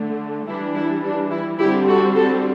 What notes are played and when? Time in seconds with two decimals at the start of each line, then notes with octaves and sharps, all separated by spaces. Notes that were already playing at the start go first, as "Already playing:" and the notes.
Already playing: D3 A3
0.47 E3 G3 D4 E4
0.75 E4
1.04 D4
1.31 E4
1.59 D3 G3 C4 E4 G4
1.87 F#4 A4
2.15 F#4 A4